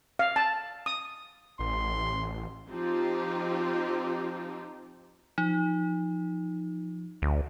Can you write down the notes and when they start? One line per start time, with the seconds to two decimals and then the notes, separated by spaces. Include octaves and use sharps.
0.19 F5
0.36 A5
0.86 D#6
1.59 A1 C6
2.70 F3 C4 D#4 F4 G4
5.38 F3 D#4
7.22 D2